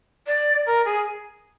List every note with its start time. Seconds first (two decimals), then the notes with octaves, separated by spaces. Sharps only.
0.26 D5
0.66 A#4
0.85 G#4